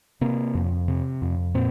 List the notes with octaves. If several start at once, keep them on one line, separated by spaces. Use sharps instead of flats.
C3 A#3
F2
C3
F2
A#2 C4